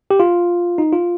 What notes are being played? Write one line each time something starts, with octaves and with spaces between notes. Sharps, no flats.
G4
F4
D#4
F4